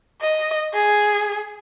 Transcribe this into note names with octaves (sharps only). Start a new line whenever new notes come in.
D#5
G#4